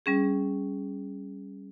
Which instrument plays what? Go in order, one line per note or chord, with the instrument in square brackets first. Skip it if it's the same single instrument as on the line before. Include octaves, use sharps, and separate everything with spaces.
[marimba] G3 C#4 G#4